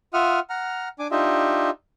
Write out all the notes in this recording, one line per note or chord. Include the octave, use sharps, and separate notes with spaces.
F4 E5 F#5 D#6 F6
F#5 A#5 F6
D4 G#5 D6
D4 D#4 F4 G4 D#5 E5